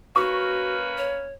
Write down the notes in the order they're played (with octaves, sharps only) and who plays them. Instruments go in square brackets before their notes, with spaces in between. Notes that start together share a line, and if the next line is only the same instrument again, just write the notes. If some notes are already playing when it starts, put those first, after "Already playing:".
[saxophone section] A#3 C#4 B4 [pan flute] F#4 [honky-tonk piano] C#6
[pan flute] C#5